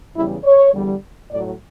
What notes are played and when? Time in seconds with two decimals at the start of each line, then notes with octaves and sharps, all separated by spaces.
0.16 E2 C#3 E3 G3 E4
0.44 C#5
0.74 E2 D3 G3
1.31 A2 F#3 D5